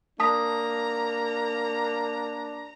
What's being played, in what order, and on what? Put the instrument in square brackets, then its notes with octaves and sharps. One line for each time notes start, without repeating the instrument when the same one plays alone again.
[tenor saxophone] A#3 [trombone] D4 [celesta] A5 D#6 B6 [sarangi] A#5